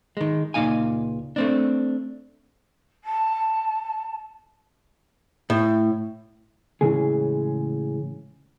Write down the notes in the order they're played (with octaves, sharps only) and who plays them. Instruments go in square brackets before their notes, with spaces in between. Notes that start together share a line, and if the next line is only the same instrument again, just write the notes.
[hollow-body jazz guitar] D#3 G#3
C#2 A#2 D#4 F5 G#5
A3 C4 D4
[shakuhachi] A5
[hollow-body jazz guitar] A2
[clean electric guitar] A2 C#3 E3 G#3 G#4